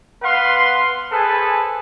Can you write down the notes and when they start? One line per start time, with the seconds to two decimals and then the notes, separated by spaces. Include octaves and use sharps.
0.23 B3 B4 F5 F#5 C6
1.11 G#4 A4 B4 C5 G#5 A5